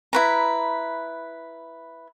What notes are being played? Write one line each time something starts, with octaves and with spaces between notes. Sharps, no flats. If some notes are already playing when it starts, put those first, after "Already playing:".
E4 B4 A#5